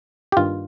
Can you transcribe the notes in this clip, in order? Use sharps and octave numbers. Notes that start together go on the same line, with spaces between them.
G4
G2 D#3 A#3 F4